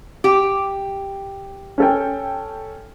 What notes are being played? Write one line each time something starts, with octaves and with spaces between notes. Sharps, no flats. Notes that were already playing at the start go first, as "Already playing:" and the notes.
G4
C#4 A4 G5